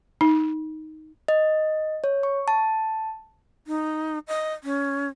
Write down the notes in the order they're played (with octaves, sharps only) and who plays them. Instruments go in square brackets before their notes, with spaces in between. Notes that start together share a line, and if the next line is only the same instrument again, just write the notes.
[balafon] D#4
[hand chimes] D#5
C#5
C#6
A5
[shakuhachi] D#4
D#5
C#4